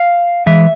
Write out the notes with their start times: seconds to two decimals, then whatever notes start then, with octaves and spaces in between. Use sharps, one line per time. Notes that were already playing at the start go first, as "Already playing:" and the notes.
Already playing: F5
0.46 E3 G#3 E5